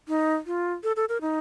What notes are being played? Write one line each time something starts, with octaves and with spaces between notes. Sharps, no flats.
D#4
F4
A4
A4
A#4
D#4